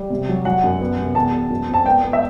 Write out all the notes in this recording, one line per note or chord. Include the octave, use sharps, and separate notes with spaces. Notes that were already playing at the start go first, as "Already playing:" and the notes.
Already playing: G3
C3
F#3
F#3 F#5
F#2
B3
C3
E2 A5
B3
F#2
C4
A5
B3 G5
B3
E5